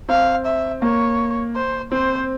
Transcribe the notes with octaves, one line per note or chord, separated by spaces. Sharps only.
C4 F5
E5
A#3 C#5
C5
C4 C5